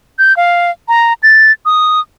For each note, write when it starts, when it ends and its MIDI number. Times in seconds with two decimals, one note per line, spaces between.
0.19 0.36 91
0.37 0.71 77
0.88 1.13 82
1.23 1.52 93
1.65 2.00 87